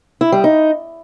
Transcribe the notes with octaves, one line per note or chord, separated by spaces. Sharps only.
E4
G3
D#4